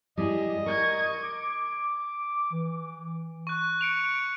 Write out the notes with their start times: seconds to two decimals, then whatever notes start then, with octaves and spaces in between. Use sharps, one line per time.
0.17 G3 E4 G#4 D#5
0.66 A#4 C#6 G#6
1.23 D6
2.52 E3
3.47 C#6 F#6
3.81 C#7 D7 F7